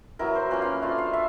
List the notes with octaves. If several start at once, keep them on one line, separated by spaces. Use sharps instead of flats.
F#3 B3 E4 A#4
C5
A#3 C#4 F4 B4
F5
A3 D4 F4 F5
F5
E5